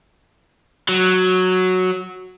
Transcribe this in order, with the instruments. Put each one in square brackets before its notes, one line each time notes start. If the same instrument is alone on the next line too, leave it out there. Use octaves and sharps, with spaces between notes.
[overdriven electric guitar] F#3